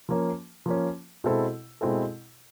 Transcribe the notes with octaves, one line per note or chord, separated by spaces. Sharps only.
F3 A#3 C#4
F3 A#3 C#4
B2 G#3 C4 E4 A4
B2 G#3 C4 E4 A4